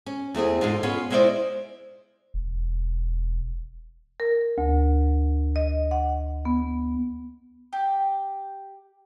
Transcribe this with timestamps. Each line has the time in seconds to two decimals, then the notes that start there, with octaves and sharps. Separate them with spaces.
0.06 C#4
0.35 E2 A3 C4 G#4
0.61 G#2 G#3 D4 F4
0.83 B3 C#4 F4 G#4
1.10 G#3 C#4 E4 C5 D5 D#5
2.34 E1
4.20 A#4
4.58 D2
5.56 D#5
5.91 F#5
6.45 B3
7.73 G4